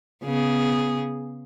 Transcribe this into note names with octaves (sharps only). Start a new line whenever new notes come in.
C#3 B3 G#4